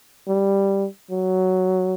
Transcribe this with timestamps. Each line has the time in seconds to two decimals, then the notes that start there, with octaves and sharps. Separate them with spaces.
0.28 G3
1.11 F#3